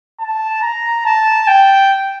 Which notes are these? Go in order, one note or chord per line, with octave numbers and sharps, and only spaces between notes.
A5
A#5
A5
G5